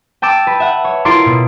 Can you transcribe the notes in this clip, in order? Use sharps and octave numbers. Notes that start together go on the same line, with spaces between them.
G5 A5 D6 E6
B4
E5 F#5
C#5
E4 F4 A4 A#4 C6 D6
B2